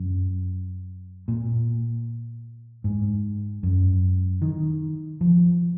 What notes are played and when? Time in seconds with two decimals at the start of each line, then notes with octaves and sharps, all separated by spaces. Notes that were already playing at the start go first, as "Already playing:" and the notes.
Already playing: F#2
1.28 A#2
2.84 G#2
3.63 F#2
4.42 D#3
5.21 F3